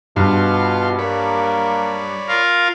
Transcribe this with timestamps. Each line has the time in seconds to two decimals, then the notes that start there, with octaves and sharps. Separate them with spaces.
0.16 G2 B2 F4 F5 C6
0.99 A#3 C#5 D5 B5
2.28 F4 A#4 F5